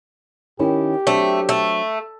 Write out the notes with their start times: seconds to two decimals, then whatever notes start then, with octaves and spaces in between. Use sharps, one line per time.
0.59 D#3 C#4 E4 G4
1.07 F#3 A3 C4 D4
1.49 A3